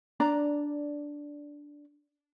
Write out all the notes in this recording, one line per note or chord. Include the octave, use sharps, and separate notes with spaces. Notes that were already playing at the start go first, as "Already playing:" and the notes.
D4 D5 A#5